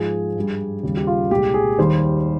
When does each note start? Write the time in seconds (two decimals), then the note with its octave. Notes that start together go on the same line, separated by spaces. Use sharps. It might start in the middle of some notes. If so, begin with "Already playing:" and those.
Already playing: G#2 F3 G#3 G#4
0.35 G2 G3
0.83 D#2 C#3 G3
0.97 G4
1.07 F4
1.31 C2 A#2 G#3 G4
1.54 G#4
1.79 D#2 D#3 G3 C5